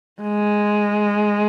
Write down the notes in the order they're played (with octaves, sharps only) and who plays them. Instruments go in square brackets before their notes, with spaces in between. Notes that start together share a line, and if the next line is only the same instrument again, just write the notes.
[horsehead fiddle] G#3